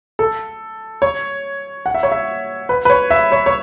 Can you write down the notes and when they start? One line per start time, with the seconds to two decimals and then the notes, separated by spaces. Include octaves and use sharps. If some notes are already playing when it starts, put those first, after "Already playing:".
0.19 A4
1.02 C#5
1.86 F#5
1.95 E5
2.03 C#5
2.12 E5
2.69 B4
2.85 B4
2.90 C#5
3.11 E5
3.32 C#5
3.46 C#5